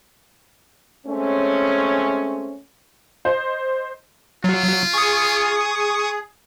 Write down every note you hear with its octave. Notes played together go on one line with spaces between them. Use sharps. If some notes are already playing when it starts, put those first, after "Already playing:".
G#3 A3 C4 C#4
C5 D#5
F#3 F4
G#4 C#6 D#6